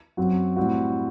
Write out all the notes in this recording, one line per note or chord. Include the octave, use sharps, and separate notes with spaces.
F#2 F#3 C4 F#4
A2 G3 C4 F#4